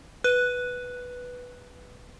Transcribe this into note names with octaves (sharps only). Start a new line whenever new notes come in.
B4 F#6